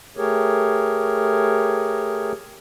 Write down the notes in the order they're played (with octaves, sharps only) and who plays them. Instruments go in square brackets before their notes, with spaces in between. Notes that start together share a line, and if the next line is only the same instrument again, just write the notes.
[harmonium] A3 G4 G#4 A#4 C#5